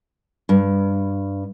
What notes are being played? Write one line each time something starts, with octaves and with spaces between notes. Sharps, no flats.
G2